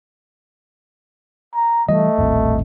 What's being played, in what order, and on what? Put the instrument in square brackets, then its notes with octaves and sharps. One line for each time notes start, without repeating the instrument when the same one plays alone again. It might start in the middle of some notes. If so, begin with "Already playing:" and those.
[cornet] A#5
[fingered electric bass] E3 G3 [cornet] A3 [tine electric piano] D#5
[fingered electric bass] D#1 A1 C4